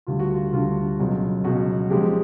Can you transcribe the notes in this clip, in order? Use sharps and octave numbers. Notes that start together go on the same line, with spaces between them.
D2 D3 G3 F4
F#4
F4
D2 D3 G3 F4
C#2 B2 F#3
C#2 B2 F#3 F#4
C#2 C#3 F3 G#3 G4